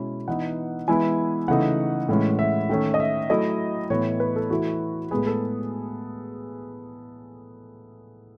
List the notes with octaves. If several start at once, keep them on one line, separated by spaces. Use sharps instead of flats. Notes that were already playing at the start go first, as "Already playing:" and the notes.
Already playing: B2 G#3 C#4 E4
E3 B3 D#4 F#5
E3 G#3 B3 E4 G#5
C#3 E3 A3 D#4 F#5
A2 E3 G#3 C#4
E5
D#3 A3 C#4
D#5
E5
F#3 A3 E4 D#5
A2 E3 B3 C#5
B4
A4
E3 A3 E4 F#4
A2 G#3 B3 G#4
A4